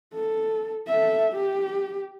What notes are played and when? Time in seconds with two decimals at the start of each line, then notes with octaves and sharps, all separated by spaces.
0.14 A4
0.87 A4 E5
1.32 G4